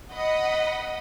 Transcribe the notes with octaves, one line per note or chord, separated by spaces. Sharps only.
D#5 F#5 B5